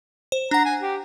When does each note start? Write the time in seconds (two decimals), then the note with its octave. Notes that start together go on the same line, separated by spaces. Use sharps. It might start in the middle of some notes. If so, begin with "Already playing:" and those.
0.32 C5
0.51 D4 F#5 A#5
0.65 G#5
0.81 G4